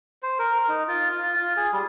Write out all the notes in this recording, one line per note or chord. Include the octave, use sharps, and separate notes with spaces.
C5
A#4
D#4
F4
F4
F4
G#4
G3